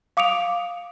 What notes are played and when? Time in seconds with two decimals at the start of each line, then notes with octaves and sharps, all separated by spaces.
0.17 F5 D6 D#6 C#7 D7 F7